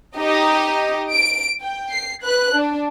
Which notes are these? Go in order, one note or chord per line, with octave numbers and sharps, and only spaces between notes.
D#4 G4 D#5
D7
G5
C7
B4 F#6
D4